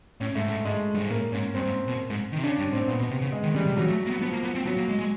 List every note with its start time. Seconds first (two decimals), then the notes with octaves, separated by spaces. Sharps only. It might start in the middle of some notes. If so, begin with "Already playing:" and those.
0.20 A2 C#4
0.35 G#2 A3
0.46 A2
0.51 G#2
0.65 G#2 G#3
0.94 G2
1.02 G#2
1.10 A2 A#3
1.32 G#2 C#4
1.54 G2 C4
1.65 G#2
1.88 B2
2.10 G#2
2.32 D#3
2.38 C3
2.43 C#3 D4
2.58 G2 C#4
2.73 A2 C4
2.88 A#2 B3
2.99 B2
3.11 C3
3.21 C#3
3.32 G#3
3.43 D#3
3.55 E3 G3
3.66 C3
3.76 E3 F#3
3.88 A3
4.06 A#3
4.10 B3
4.21 F3 B3
4.32 A#3
4.43 B3
4.55 C4
4.66 F#3 B3
4.77 A#3
4.88 G#3
4.99 G#3